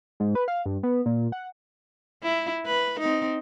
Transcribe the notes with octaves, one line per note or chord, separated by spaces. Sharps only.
G#2
B4
F5
G2
B3
A#2
F#5
E4
B4
C4 D#4